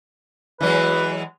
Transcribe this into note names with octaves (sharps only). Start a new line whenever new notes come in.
E3 F#3 G#3 B4